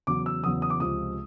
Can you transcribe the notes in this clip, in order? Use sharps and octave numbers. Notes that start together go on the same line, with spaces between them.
E2 C#3 F#3 B3 D6
E6
E2 C#3 F#3 B3 D#6
D#6
D6
C#2 C3 F3 D#6